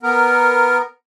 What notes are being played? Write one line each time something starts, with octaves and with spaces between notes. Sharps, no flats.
B3 A#4